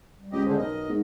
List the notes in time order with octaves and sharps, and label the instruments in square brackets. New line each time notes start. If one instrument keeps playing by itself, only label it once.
[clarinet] G3
[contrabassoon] C#2 [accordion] G4 D#5
[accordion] A2 D3 G#3 [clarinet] C5
[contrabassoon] B1 [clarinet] A#4 [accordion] D#5
[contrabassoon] G#2